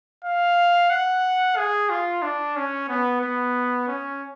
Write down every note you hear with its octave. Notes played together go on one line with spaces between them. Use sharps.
F5
F#5
G#4
F4
D4
C#4
B3
B3
C#4